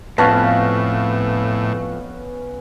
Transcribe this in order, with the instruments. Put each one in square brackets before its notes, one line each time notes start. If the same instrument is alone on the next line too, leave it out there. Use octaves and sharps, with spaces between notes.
[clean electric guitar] F2 [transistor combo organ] A2 [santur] B3 C#4 F5 [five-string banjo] A5